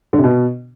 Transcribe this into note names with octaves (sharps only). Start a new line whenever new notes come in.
D3
C3
B2